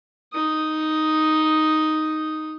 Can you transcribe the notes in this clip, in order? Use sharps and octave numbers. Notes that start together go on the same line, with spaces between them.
D#4 D#6